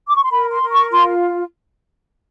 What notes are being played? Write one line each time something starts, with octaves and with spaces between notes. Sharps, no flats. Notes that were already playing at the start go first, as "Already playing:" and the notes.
D6
C#6
C6
A#4 B5
C6
A#4
C#6
F4 C6